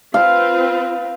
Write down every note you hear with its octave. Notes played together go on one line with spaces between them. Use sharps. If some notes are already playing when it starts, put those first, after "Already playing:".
C4 F4 B4 F5